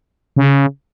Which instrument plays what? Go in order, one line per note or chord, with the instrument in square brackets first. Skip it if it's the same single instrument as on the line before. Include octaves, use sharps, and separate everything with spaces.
[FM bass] C#3